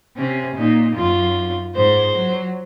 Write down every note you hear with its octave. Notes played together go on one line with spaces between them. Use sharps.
C3 C#4
A#2 D#4
F#2 F4
G#2 C5
F#3